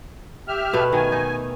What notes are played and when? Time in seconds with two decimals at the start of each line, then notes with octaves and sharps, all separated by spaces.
0.48 G4 E5 F6
0.73 B2 A3 B3
0.93 D#3 G#5
1.12 D#4